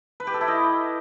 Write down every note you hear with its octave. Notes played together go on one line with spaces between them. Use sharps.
B4
G4
A4
E4
D#5